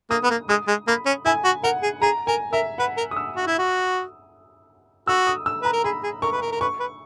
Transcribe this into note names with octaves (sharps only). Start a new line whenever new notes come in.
A#3 D#6
B3
A#3
G#3 D#6
G#3
A#3 B5
C#4
E4 G#5
F#4
A#4 F#5
G#4
G#4 A#5
A#4 G#5
A#4 E5
B4 F#5
A#4
D#6
E6
F#4
E4
F#4
F#4 E6
D#6
E6
B4 A#5
A#4
G#4 B5
G#4
A#4 C#6
B4
A#4
A#4
B4 C#6
B4